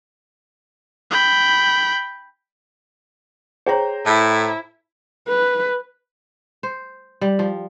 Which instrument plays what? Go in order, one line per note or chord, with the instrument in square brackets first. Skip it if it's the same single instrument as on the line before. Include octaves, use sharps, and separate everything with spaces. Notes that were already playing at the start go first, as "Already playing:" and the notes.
[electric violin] G5 B5
[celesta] G#4 C#5 [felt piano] C5 G5 A#5
[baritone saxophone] A2 [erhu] E4 [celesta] A5
[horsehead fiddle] B4
[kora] C5
G3
F3